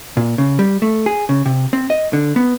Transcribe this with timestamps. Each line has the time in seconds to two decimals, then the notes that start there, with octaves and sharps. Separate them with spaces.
0.17 A#2
0.38 C#3
0.59 G3
0.82 A3
1.06 G#4
1.29 C#3
1.46 C3
1.73 C4
1.90 D#5
2.13 D3
2.36 B3